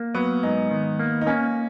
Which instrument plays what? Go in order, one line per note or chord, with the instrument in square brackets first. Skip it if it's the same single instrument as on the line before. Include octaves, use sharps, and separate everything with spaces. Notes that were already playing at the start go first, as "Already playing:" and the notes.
Already playing: [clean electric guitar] A#3
[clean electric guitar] F#3 [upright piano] B3
[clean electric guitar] G#2 [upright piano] D#4
[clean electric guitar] D#3
A#3
[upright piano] D#4
[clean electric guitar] A#3 [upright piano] C#4